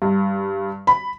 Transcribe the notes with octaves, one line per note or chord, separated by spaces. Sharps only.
G2
B5